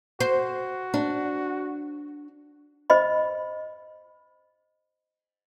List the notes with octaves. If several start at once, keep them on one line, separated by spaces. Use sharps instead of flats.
F#4 C5
D4
C5 D#5 B5